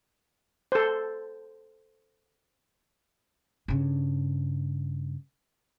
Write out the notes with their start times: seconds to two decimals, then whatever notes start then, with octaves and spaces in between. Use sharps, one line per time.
0.72 A4 C5
3.68 G2 C#3